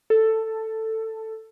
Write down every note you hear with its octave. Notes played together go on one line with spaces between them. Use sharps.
A4